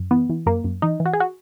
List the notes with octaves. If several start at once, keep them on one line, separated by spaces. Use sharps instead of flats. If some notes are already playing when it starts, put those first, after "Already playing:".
Already playing: F#2
E3 B3
E3
F#2 A#3
F#2
E3 D#4
E3
F#4
G#4
F#4